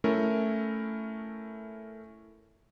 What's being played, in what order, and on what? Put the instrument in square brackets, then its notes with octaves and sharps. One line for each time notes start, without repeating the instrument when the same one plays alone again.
[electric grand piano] A3 C#4 E4 A#4